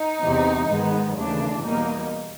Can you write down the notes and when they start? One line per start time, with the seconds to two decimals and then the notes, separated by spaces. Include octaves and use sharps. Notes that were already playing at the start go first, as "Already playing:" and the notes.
Already playing: D#4
0.21 E2 C3 E3
0.68 G#2 D#3 G#3 B3
1.15 D#2 C#3 E3 A3 D4
1.63 E2 B2 G3 A#3 D#4